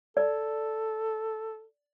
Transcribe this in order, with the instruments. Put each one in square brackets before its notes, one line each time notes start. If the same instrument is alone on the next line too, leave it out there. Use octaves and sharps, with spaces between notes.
[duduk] A4 [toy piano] D5